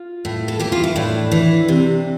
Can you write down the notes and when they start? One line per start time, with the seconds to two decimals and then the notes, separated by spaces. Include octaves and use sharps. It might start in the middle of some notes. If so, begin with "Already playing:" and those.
Already playing: F4
0.25 A2
0.48 A4
0.60 E3 G4
0.72 F4
0.84 E4
0.96 A2 D4
1.32 E3
1.68 C3